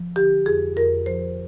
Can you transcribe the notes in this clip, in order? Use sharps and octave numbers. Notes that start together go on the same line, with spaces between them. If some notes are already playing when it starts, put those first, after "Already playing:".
Already playing: F3
D3 G4
F2 G#4
F2 A#4
F3 C5